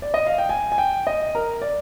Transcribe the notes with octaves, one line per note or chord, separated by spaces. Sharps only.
D5
D#5
F5
G5
G#5
G#5
G5
D#5
A#4
D5